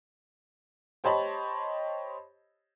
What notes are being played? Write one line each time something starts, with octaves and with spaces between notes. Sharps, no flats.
G4 C5 C#5 D#5 A5 B5